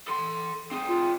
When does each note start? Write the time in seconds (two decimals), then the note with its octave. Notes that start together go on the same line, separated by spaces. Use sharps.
0.08 A4 C6
0.72 C4 G#4
0.89 F4